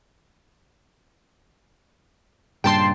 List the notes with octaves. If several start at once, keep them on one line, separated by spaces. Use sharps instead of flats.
G2 A#2 C#3 G5 A5 C6